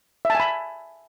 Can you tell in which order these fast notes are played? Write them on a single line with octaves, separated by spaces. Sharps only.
E5 A5 G#5 B5